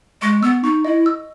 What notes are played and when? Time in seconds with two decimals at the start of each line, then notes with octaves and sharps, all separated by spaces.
0.22 G#3 C#6
0.43 B3 E6
0.64 D#4 C#6
0.85 E4 D#5
1.06 E6